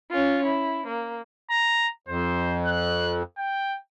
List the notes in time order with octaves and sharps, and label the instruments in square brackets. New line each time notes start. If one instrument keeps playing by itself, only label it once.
[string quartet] C#4 F4
E4
A#3
[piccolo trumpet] A#5
[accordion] F2 [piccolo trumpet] C5
[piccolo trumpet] F#6
G5